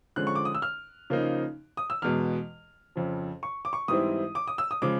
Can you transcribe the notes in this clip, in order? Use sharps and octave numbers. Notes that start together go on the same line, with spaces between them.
D3 F3 G#3 C#4 F#6
C#6
D6
D#6
E6
F6
C#3 F3 A#3 D#4
D#6
E6
E2 B2 G#3 F6
F2 C#3 F3
C#6
D6
C#6
G#2 E3 G3 C4 E4 D#6
D6
D#6
E6
D#6
C#3 F3 G#3 D6